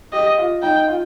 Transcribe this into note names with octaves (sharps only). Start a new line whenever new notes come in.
G4 D#5
F4
D#4 G5
F4